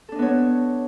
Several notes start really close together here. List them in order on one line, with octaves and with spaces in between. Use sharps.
A4 D4 D#5 B3 C#5